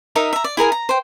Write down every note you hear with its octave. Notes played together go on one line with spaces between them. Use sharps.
D#4 A#4 D#5 E5
E5 A#5
D5
E4 G#4 A#4 G#5
A#5
C5 G5